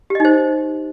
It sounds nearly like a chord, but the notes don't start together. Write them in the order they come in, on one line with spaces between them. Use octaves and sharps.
G4 D#5 D#4 C5